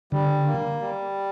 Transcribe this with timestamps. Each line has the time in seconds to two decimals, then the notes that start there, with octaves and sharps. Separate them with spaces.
0.12 D3 G3
0.47 A#3
0.81 G3